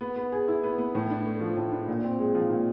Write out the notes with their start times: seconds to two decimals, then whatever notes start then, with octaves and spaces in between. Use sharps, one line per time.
0.01 B3
0.16 B3
0.32 G#4
0.48 E4
0.63 B3
0.78 B3
0.95 A2
1.10 D4
1.26 A3
1.41 F3
1.57 A2
1.72 D4
1.88 A#2
2.03 C4
2.19 G#3
2.35 F3
2.50 A#2